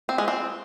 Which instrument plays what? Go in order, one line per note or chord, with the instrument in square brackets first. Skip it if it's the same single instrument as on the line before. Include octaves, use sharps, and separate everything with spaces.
[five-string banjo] C4
G#3
C4